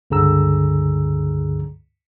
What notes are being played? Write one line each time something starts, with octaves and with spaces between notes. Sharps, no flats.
C#2 G2 D3 G#4 A#5 E6